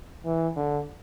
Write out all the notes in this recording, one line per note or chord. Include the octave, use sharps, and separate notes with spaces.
E3
D3